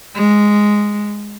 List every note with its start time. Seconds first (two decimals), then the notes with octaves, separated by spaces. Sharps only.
0.16 G#3